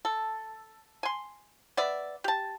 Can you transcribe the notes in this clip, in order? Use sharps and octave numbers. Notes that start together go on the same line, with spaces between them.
A4
G#5 C6
B3 D5 E5
G4 A5